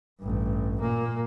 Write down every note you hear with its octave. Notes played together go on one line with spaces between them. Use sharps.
A1 G2
A#2 A#3